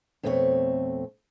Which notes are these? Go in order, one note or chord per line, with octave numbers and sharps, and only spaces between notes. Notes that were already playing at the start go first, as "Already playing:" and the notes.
F2 B2 A3 C4 A4 C#5